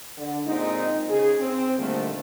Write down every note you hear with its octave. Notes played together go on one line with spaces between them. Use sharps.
D3
A#2 G#3 C4 D#4
C#3 G#4
C4
A#2 D3 D#3 G3 A3 A#3